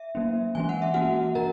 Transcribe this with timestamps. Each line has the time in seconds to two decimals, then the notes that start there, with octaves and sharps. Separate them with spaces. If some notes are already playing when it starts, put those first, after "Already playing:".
Already playing: E5
0.15 F#3 A#3 C#4
0.55 E3 G#3 C#4 G#5
0.69 F#5
0.82 E5
0.94 E3 A#3 C#4 F#4 F#5
1.35 E3 A#4 A#5